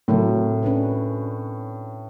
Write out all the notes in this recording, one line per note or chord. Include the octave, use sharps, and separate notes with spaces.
A2 C3 F#3 A#4
C#4 D4 B4